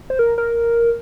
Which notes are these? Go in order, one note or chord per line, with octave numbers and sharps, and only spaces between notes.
C5
A#4
A#4